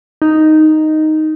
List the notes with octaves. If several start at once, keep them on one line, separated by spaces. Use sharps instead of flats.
D#4